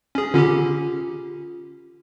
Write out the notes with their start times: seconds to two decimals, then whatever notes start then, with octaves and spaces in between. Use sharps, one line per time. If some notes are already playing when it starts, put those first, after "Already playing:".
0.15 C#4 G#4
0.34 D3 C#4 F4 G4